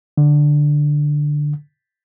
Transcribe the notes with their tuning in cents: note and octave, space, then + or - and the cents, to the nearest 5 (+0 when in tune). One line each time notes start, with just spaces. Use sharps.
D3 +5